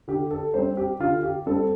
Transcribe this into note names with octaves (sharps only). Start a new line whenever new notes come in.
D3 G4
A4
G3 C4 C5
G4
D3 F4
G4
G3 C4 A4